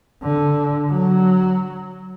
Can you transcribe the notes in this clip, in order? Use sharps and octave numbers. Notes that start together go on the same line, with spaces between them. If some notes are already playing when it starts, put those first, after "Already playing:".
D3
F#3